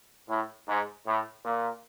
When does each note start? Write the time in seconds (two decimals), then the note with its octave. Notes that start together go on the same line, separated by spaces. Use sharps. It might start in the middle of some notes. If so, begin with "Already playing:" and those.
0.29 A2
0.69 G#2
1.07 A2
1.45 A#2